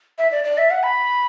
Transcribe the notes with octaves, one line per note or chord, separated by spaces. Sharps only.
E5
D5
D5
E5
F#5
B5